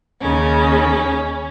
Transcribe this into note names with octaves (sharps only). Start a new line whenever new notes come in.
D#2 C#3 C#4